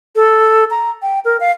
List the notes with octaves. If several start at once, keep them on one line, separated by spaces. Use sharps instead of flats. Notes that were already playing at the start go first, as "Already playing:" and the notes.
A4
A#5
G5
A#4
F5